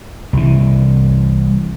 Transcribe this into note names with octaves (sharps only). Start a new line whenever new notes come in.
C2 E3